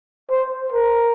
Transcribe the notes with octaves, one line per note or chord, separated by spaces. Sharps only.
C5
A#4